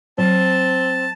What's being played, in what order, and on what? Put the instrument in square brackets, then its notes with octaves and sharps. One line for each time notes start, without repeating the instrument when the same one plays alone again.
[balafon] F#3 [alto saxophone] C4 [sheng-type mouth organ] A5